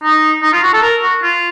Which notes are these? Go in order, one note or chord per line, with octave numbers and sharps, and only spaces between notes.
D#4
D#4
F4
F#4
A4
A#4
F#4
F4